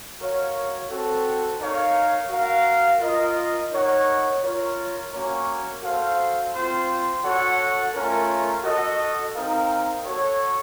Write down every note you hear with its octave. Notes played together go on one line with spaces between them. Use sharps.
F#4 A#4 C#5 F5
C4 F#4 A4
D#4 A#4 C#5 F5
F#4 A#4 F5
F4 A#4 D#5
D#4 A#4 C#5 F#5
F4 A#4 C#5
A#3 C#4 F#4 A#4 C#5
F#4 A4 C5 F5
C4 F4 C5
F#4 A4 C#5 F#5
A3 C#4 F4 A#4
F#4 A4 D#5
C4 D#4 A#4 F5
F#4 A4 C#5